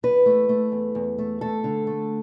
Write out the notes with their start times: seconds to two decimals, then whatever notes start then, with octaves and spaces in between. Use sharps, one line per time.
0.03 E2 B4
0.26 A3
0.49 A3
0.72 E2
0.95 E2
1.18 A3
1.41 A3 A4
1.64 D3
1.87 A3